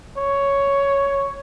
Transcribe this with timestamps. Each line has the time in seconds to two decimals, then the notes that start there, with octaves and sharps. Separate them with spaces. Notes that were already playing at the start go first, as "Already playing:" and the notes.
0.17 C#5